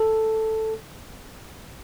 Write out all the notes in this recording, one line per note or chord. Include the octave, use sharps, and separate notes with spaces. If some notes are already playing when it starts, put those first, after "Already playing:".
Already playing: A4